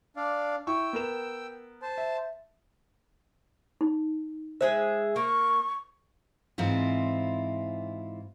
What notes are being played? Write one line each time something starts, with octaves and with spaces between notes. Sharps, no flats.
D4 D5 F5
E4 G5 C#6 E6
B3 A#4 E7
C5 A5
E5
D#4
G#3 G#4 C5 E5
A#3 C#6
G#2 E3 C4 E4 F4